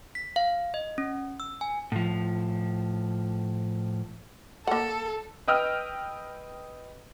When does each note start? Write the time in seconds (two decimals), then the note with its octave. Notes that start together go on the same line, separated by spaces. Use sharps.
0.15 B6
0.36 F5
0.74 D#5
0.98 C#4
1.40 E6
1.61 G#5
1.92 A2 F3
4.67 A#3 A4 F#5
5.48 B4 D#5 G5 E6 F6